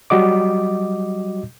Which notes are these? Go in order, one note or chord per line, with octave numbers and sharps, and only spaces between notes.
F#3 G3 F#4 D#5 D6